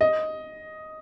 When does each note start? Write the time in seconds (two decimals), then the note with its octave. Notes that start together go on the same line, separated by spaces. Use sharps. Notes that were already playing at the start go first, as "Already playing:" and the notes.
0.01 D#5